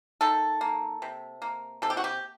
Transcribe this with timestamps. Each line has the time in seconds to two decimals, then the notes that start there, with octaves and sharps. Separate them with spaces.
0.21 D#3 A4
0.61 A#3
1.02 C3
1.42 A#3
1.82 C3 A4
1.90 G4
1.97 F#4
2.04 G4